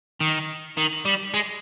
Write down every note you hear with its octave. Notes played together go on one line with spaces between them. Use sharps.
D#3
D#3
G3
G#3